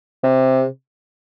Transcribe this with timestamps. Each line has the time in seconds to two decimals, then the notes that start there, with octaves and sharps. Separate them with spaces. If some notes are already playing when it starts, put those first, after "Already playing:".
0.24 C3